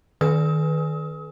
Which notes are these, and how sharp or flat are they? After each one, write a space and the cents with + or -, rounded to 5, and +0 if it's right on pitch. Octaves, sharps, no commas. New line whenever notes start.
D#3 +0 B4 +0 D#6 +40